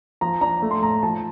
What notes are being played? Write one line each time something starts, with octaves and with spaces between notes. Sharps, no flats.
F3 A#5
D4 A#5
A3
C6
A2 A#5
F3 A5